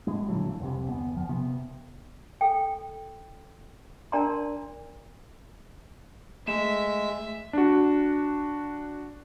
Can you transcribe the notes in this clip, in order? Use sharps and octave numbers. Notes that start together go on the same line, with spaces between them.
A2 G#3
A#2 D3 E3 F#3
F1 C2 C3
G1 E2 B3
F#1 E2 F3
F#1 C3 B3
A4 G5
D4 A#4 D5 A5 A#5 C6
G#3 A3 E5 E7
D4 F#4